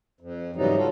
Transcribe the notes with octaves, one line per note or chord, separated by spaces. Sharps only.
F2
G#2 C#3 E3 F#3 G3 D#4
F4 F#4 A4